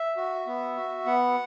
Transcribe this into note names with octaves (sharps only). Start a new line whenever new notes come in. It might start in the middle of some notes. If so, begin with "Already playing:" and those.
Already playing: E5
F#4
B3
F#4
B3 F#5